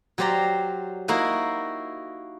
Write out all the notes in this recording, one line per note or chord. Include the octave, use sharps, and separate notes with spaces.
F#3 G4 C5 D5 A#5
A#3 D#4 E4 F#4